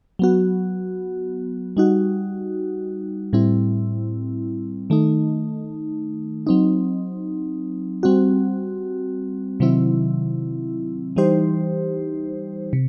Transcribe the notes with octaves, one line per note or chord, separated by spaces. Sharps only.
F#3 B3 F#4
G3 D#4 F#4
A2 G3 C4 E4
D#3 A3 D#4
F#3 C4 D#4
G3 C4 F#4
C3 D#3 F#3 C4 E4
E3 G3 D#4 G4 C5
C3